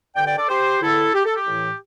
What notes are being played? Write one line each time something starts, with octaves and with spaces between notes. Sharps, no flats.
G2 D3 D5 G5
D5 G5
A4 D5
G4 C5
E2 D3 E4 A4
G4
A4
G4
A2 E3